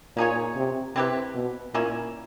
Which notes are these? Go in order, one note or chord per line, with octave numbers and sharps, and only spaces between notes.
A#2 A#3 D#4 G#4 C#5
C3
C3 C4 E4 G4 B4
B2
A#2 A#3 C#4 E4